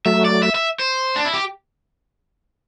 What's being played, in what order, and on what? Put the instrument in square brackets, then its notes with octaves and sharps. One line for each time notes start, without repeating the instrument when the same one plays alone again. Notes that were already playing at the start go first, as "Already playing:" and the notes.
[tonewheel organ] F#3 A3 [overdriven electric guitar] E5
[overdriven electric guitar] D5
E5
E5
C5
D4
E4
G4